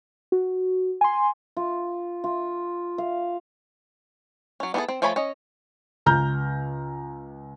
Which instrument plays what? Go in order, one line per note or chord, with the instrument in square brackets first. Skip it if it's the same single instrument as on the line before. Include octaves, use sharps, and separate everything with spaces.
[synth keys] F#4
G#5 C6
[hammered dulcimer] F4
F4
F5
[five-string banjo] F#3 C#4
B3 D4 E4 G#4 A4
C4
F3 A3 C#5 G#5 B5
C#4 D#5
[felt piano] C#2 A#5 F6 G6